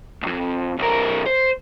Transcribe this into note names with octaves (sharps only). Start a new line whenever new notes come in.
C2 F2
B1 A#4
C5